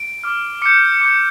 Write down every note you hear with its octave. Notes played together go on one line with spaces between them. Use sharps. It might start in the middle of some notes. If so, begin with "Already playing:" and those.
Already playing: D7
D6 F6
D6 G6 C#7
D6 G6